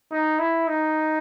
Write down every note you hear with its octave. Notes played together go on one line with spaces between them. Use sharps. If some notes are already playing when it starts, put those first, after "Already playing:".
D#4
E4
D#4